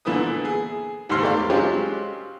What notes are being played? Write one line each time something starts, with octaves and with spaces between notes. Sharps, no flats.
A#2 D3 E3 B3 B4 D#6
G#4
D#2 G#2 C5 C6 F6
E2 A3 G4 D5 F5
F#3 G#3 C4 C#4 F4 G4